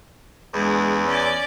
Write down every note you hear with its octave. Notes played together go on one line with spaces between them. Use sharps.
E2 G#3 D4
C#4 D5